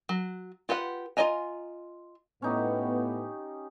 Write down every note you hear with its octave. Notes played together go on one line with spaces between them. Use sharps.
F#3
F4 G4 B4 F#5
F4 B4 D#5 G#5 A#5
A2 B3 C#4 D#4 G4